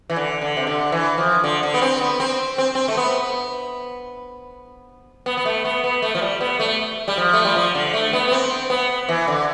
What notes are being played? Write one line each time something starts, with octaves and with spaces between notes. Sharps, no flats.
E3
D3
D3
C3
D3
E3
F3
D3
D3
B3
C4
B3
C4
C4
C4
A3
B3
B3
B3
A3
B3
B3
A3
F3
G3
B3
A3
G3
F3
A3
G3
F3
D3
A3
B3
B3
C4
B3
E3
D3